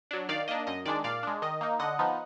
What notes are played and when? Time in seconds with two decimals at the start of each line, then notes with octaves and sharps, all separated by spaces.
0.11 F#3 D4
0.29 D#3 D5 F5
0.48 A#3 D4 D#5
0.67 F#2 D#5
0.85 D#3 G#3 D4 D5
1.04 A#2 D5 F5
1.23 G#3 D4
1.42 D#3 D#5
1.61 A#3 D#4
1.79 D3 D#5 F#5
1.99 F3 B3 D#4